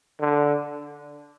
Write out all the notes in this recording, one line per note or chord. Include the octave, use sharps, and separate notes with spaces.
D3